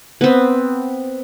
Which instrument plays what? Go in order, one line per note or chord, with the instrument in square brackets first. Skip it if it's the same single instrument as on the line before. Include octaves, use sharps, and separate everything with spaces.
[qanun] B3 C4